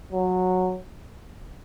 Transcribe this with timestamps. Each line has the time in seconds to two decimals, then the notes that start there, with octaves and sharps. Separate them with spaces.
0.12 F#3